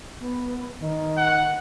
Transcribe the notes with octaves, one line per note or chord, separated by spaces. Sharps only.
B3
D#3
F#5